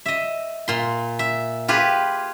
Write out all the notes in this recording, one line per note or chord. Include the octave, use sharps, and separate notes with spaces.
D#5 E5
A#2 C6
E5
F4 G4 G#4 B4